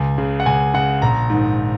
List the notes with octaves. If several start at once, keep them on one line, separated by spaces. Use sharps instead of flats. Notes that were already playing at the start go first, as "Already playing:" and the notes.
Already playing: C#2 G#5
C#3
F#5
C#2 G#5
C#3 F#5
A#1 A#5
G#2 D#3